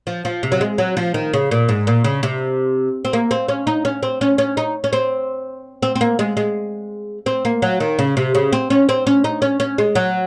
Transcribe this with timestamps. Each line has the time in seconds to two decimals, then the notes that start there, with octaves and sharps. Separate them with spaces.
0.07 F3
0.25 F3
0.43 C3
0.52 F#3
0.61 G#3
0.78 F#3
0.97 F3
1.14 D#3
1.33 C#3
1.51 A#2
1.69 G#2
1.87 A#2
2.04 C#3
2.23 C3
3.05 C4
3.13 A#3
3.31 C4
3.49 C#4
3.67 D#4
3.85 C#4
4.03 C4
4.21 C#4
4.38 C#4
4.57 D#4
4.84 C#4
4.93 C4
5.83 C4
5.95 C4
6.01 A#3
6.19 G#3
6.37 G#3
7.26 C4
7.45 A#3
7.62 F#3
7.80 D#3
7.99 C#3
8.17 C3
8.35 C#3
8.53 C4
8.70 C#4
8.89 C4
9.07 C#4
9.24 D#4
9.42 C#4
9.60 C#4
9.78 G#3
9.95 F#3